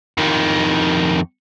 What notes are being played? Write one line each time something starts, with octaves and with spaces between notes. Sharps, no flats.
F2 D#3